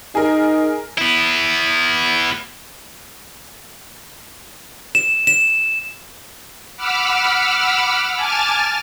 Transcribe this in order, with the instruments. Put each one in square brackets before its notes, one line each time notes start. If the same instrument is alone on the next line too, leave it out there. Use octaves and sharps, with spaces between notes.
[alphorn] D#4 [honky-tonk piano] G#4 A#4
[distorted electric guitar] B3 E4
[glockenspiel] E7
E7
[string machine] F#5 B5 D6 E6 F6
G#5 A5 D6 F6 A6